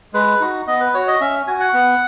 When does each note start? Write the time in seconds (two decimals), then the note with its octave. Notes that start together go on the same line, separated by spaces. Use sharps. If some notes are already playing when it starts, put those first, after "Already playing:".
0.13 G#3 B4
0.40 D#4 F#4
0.67 B3 D#5
0.81 B4
0.94 F#4 C#5
1.07 D#5
1.21 C#4 E5
1.47 F#4 G#5
1.60 F#5
1.74 B3